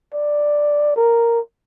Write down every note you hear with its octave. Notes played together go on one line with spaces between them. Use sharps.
D5
A#4